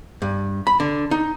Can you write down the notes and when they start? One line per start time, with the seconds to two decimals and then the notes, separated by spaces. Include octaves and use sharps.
0.22 G2
0.67 B5
0.80 D3
1.11 D#4